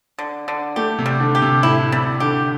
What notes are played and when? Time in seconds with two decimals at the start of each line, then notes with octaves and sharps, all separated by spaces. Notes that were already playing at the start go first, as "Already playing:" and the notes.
0.18 D3
0.48 D3
0.76 A3 G4
0.98 C3
1.06 G3
1.20 D3
1.35 G4
1.42 C3
1.63 A2 E4
1.92 C3 G3
2.20 D3 G4